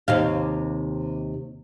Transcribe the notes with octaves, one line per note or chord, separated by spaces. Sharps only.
D#2 C3 F5